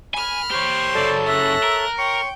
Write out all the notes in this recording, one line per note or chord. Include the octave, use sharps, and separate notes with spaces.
G#5 B5 F6
G4 C5 C#5
F#2 C#3 A4 C#5 D5 A5
E5 F#6 A#6
A#4
C#5 G5 C6 C#6